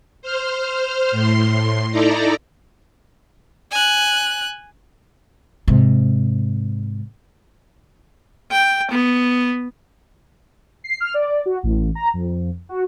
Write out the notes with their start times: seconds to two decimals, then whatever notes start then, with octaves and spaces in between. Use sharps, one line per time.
0.22 C5 F6
1.11 A2 C6
1.92 D#4 E4 A4 D5 A#5
3.71 G#5 F#6
5.68 G#2 C3
8.51 G5
8.91 B3
10.84 C7
11.00 F6
11.14 D5
11.46 F#4
11.63 A1
11.95 A#5
12.14 F2
12.69 F#4